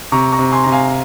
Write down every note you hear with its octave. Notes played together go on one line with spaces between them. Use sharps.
C3 A#5 C#6
A#5 C#6
C3
G#5 C6
C3 A#5
F5 G#5